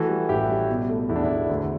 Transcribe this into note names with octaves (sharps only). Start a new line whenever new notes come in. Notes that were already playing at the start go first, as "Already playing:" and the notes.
Already playing: E3 A3 F#4 A4
G3
A1 E4 G4
G3
B2
A3
E2 E4
D4
E4
E2
D2